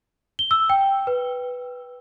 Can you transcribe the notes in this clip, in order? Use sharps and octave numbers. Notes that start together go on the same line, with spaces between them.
G7
E6
G5
B4